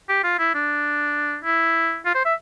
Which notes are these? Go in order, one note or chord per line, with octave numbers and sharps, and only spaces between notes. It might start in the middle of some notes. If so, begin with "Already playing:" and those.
G4
F4
E4
D4
E4
F4
C5
E5